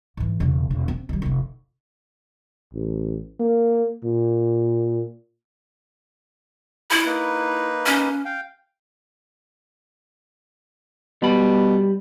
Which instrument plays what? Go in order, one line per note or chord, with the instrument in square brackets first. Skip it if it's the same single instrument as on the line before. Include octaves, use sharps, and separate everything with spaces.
[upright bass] G#2 E3
E1 C#3
E1
C4
D#3 G3
F1 E4
[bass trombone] A1
A#3
A#2
[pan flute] E4
[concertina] A#3 D#4 B4
[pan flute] C#4
[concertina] F5 G5
[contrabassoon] B2 [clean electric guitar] G3 B5